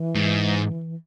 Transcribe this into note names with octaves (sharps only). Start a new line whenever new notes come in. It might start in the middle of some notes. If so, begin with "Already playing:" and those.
Already playing: E3
G#2